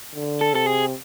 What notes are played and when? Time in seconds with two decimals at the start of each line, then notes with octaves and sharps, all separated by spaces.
0.15 D3
0.41 A4
0.53 C3 A4
0.66 G#4